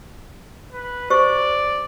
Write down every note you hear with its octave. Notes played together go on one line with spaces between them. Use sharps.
B4
G4 C5 D5 C#6